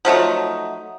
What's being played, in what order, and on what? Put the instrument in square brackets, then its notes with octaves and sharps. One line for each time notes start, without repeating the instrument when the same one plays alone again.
[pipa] F3 F#3 A3 D#4